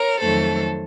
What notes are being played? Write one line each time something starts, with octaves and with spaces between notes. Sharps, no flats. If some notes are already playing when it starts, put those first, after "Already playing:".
Already playing: A#4 C#5
F2 D#3 F#3 A3 A4 C5